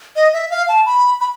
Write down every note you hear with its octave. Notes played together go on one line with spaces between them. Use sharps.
D#5
E5
F5
A5
B5
B5